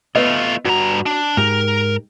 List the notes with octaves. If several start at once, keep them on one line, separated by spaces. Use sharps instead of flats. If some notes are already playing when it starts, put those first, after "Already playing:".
A3 B3 F4 B4 D#5
G2 F#4 A#5
D4
G#2 G4 A#4